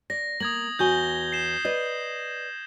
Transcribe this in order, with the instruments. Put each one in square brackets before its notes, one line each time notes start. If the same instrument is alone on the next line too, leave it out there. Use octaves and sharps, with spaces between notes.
[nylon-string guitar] D5 [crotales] A#6
[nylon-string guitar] A#3 [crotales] D#6 G#6 F#7
[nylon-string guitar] E2 F#4 G#5 [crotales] G6 G7
[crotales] C7 E7
[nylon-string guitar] B4 D5 D#5